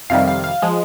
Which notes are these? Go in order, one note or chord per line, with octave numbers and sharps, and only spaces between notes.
F2 C3 D#3 G3 F5
F5
F5
F3 G#3